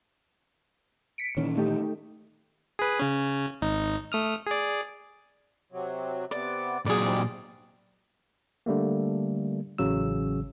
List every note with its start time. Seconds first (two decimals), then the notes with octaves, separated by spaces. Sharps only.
1.18 B6 C#7 D7
1.37 A#2 D#3 E3 C#4
1.57 A3 D#4 G4
2.79 G#4 B4
2.99 C#3 C#4
3.62 G#1 D#4
4.12 A3 D#6 F6
4.47 G#4 D5
5.72 C3 F#3
6.31 C3 B3 D5
6.86 F2 A#2 F#3 G#4 D5
7.02 G#2 C3 G3
8.66 D3 G3 A3 A#3
9.78 A1 C#3 F#3 E6